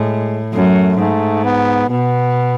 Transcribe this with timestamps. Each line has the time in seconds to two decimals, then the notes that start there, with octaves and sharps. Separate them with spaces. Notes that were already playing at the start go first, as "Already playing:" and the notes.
Already playing: A2 G#3
0.54 F#2 A3
0.99 G#2 A3
1.45 B3
1.90 B2 B3